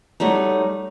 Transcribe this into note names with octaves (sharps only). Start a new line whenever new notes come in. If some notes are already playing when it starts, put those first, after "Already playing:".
F#3 G3 A3 D#4